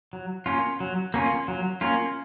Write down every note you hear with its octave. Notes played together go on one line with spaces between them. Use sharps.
F#3
A#3 C#4 F4
F#3
A#3 C#4 F4
F#3
A#3 C#4 F4